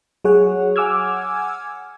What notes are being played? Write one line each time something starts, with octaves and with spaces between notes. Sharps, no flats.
F#3 G#4 C#5 F#5
F#5 G#5 D6 E6 F6 G#6